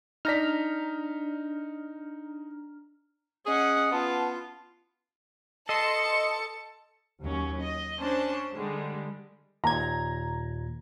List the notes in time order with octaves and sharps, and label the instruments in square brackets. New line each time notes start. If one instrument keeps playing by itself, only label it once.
[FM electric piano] D4 A#5 F6 [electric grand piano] D#4 B6
[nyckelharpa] C#4 F#5 [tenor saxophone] G#4 [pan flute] D#5
[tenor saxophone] B3 [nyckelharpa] F4 [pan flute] A5
[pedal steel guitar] A4 [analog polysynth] D#5 C6 [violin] A5 C#7
[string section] D#2 F#3 C#4
D#5
C#4 D4 C5 A5
D3 G3 G#3
[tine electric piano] D#2 A#2 G#6 [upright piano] A#5